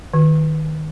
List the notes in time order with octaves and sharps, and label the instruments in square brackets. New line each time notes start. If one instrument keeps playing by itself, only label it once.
[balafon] D#3